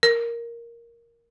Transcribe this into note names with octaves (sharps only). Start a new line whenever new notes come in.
A#4